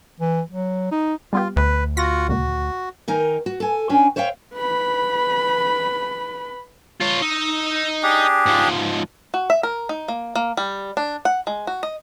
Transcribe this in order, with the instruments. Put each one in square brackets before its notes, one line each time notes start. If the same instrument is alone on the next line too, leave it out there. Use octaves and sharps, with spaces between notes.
[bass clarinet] E3
F#3
D#4
[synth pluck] G3 B3 G4 [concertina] F4
[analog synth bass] D2 [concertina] B4
[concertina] F4 F#4 F#5 [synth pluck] A#6
[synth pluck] C#2 A#2 [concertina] F#4
[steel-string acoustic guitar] D#3 D#4 A#4 G#5
F#4
A4 G#5
C#4 D4 G5 G#5
C5 C#5 E5 F5 G5
[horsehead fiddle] B4 B5
[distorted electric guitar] F4 C#5
[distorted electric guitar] D#4 [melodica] E6
[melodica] D4 G4 G#4
[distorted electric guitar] G#2 F3
[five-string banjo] F#4
E5
A#4
D#4
A#3
A#3
G3
D4
F#5
G#3
F#4
D#5